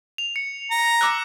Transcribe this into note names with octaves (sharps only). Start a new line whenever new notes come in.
F7
C#7
A#5
D6 E6 F#6